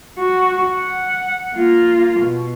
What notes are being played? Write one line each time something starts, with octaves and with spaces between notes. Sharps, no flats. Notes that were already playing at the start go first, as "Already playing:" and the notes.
F#4
F#5
A#3 F4
B2